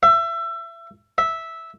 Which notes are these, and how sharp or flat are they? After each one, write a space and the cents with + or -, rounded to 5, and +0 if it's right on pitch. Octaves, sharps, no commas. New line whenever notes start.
E5 +25
E5 -10